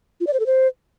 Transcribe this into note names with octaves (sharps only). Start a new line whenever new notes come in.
F4
D5
C5
A4
C5